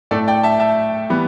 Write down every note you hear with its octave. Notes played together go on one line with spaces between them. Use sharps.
A2 A3 A4 D5
D5 G5
E5 A5
E5 A5
E3 G3 B3